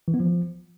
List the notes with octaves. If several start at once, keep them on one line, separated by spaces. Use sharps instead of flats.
E3
B3
F3